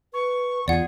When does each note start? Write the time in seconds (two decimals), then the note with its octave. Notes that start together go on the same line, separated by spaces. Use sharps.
0.14 B4 C#6
0.68 E2 F4 G#4 D5 F#5